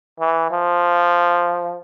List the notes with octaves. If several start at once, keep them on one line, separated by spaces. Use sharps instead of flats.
E3
F3